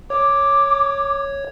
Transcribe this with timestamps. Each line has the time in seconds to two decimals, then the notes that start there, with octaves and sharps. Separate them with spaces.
0.10 C#5 D6